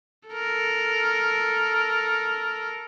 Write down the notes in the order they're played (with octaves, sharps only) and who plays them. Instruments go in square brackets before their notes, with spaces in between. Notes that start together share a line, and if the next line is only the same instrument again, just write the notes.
[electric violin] A4 A#4